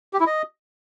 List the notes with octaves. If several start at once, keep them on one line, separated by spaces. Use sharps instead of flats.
G4
E4
D#5